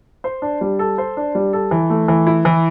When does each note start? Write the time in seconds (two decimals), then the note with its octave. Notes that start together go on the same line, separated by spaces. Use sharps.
0.24 C5
0.42 D4
0.61 G3
0.79 A4
0.98 C5
1.17 D4
1.35 G3
1.53 A4
1.71 E3
1.90 A3
2.08 E3
2.27 E4
2.45 E3